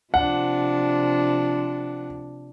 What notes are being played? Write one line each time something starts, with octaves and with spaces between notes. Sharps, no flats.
C3 F3 D4 F#5